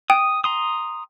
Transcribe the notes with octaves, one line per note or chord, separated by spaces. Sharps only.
G5 D#6
A#5 C6 D#6